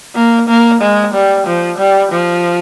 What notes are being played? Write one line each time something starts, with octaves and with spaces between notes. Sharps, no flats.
A#3
A#3
G#3
G3
F3
G3
F3